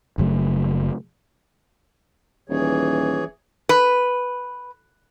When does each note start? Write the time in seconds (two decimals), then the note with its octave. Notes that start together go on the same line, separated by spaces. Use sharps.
0.18 F#1 C#3 F#3 A3
2.50 D#1 E3 G#4 C#5
3.69 B4